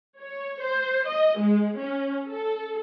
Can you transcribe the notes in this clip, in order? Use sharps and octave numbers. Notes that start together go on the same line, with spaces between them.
C#5
C5
D#5
G#3
C#4
A4